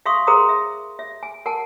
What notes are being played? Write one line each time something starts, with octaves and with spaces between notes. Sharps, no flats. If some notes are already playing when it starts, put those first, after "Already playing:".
E5 F5 C6 C#6 D#6
G#4 A#4 C5 A#5 C6 D#6
E5
E5
G#5
A#4 F#5 G#5 A5